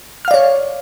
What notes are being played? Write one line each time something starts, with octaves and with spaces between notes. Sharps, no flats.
C#5 D5 F5 F6